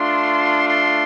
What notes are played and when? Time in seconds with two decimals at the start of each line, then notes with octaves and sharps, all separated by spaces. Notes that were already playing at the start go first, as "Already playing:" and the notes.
Already playing: A3 D4 F4 C6
0.68 C6